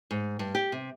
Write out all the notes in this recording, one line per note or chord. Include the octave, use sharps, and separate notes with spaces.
G#2
G2
G4
C3